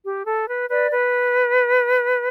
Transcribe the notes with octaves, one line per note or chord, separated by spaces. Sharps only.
G4
A4
B4
B4 D5
B4